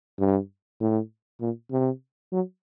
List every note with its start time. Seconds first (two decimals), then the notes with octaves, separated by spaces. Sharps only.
0.19 G2
0.80 A2
1.41 A#2
1.71 C3
2.32 F#3